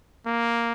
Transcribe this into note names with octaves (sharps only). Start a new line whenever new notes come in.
A#3